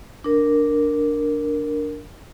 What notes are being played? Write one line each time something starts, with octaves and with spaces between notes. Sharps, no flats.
D4 A#4